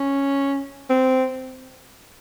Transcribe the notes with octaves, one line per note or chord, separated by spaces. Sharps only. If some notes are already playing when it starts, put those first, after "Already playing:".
Already playing: C#4
C4